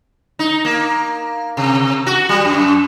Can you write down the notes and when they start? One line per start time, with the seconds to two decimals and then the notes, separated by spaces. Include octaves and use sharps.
0.39 D#4
0.65 A#3
1.57 C3
2.07 F#4
2.29 G3
2.45 F#2